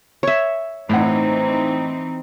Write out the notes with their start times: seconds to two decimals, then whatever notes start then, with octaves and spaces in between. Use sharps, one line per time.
0.23 C#5 E5
0.89 A2 E3 C4 D#4 F#5